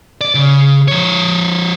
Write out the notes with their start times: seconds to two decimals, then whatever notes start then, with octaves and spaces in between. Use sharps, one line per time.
0.21 D5
0.35 C#3
0.88 F3 C#5